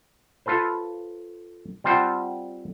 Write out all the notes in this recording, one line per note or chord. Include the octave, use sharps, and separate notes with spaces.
F4 A4 B4 C5
G3 C4 F4 C5 F#5 A5